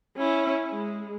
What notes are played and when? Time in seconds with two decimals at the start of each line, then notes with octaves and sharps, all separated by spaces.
0.18 C#4 E4
0.70 G#3